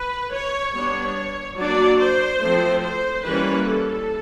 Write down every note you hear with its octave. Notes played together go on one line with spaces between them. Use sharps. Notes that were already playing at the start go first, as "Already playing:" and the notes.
Already playing: B4
C#5
G3 B3 D4 C#5
F#3 A#3 D4 D5
C5
F3 A3 C4
C5
E3 G3 A#3 C#4 B4
A4